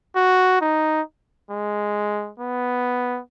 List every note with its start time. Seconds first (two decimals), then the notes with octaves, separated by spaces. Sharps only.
0.16 F#4
0.61 D#4
1.51 G#3
2.40 B3